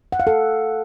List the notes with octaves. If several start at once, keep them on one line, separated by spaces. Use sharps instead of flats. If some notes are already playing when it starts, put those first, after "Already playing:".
F#5
F5
A4